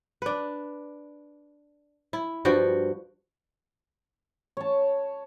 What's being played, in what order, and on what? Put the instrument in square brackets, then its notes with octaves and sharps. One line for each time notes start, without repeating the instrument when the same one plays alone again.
[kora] D4 B4
E4
G2 F3 F#4 G5
[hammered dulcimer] C#5 A5